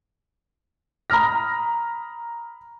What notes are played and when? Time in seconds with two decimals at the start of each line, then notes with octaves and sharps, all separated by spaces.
1.10 A#5 B5 D#6 F6 A#6